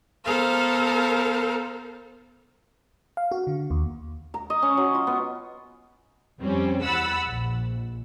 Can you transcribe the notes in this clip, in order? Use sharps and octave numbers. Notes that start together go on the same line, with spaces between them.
B3 A4 A#4 C5 F5
F5
F#4
D3
D#2
A#5
D#5
C#4
F#3
F4
B3
F2 G3 C4 C#4
E2 F#5 B5 E6 A6
A#1